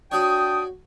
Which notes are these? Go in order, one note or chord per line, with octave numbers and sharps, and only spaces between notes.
D4 F#4 C#5 G5 D#6